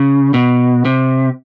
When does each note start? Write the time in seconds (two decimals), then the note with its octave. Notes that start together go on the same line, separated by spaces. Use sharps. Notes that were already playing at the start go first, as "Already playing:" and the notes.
Already playing: C#3
0.34 B2
0.85 C3